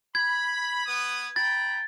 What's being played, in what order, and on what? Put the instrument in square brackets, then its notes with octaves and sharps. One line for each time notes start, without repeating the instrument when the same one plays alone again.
[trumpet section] B5 [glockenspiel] G#6
[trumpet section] B3 B4 D#6
[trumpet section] G5 A#5 B5 [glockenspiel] A6